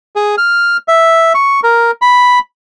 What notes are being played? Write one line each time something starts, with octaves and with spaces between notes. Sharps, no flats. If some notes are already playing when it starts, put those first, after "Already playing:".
G#4
F6
E5
C#6
A#4
B5